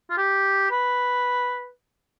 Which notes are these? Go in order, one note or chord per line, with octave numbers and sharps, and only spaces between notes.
F4
G4
B4